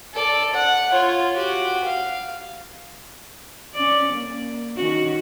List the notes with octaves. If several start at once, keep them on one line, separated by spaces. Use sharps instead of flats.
A4 D5
F#5
F4 C#5
F#4 G4
F5
C#4 D5
A#3
D#3 C#4 F#4